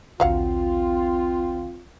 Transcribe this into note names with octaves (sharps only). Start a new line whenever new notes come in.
A#1 D#2 D3 F#3 C4 F4 F5 F#5